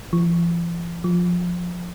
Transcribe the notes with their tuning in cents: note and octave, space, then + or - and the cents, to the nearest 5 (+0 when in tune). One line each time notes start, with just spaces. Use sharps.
F3 -45
F3 +15